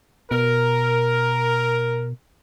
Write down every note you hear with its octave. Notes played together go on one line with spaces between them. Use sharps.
B2 A#4